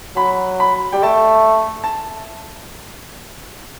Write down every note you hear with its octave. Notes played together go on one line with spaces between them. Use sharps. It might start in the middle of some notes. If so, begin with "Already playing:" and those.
F#3 B5
B5
G3 G5
A3 A5
A5